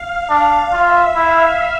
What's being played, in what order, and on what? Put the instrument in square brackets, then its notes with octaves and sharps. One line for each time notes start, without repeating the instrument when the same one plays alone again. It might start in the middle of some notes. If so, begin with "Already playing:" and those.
Already playing: [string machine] F5
[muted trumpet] D4
[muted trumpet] F4 [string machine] E5
[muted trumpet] E4 [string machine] F5